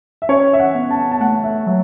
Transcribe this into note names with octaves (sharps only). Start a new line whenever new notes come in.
E5
C#4 C#5
E5
F#5
B3
A5
A5
A3 F#5
E5
F#3 E5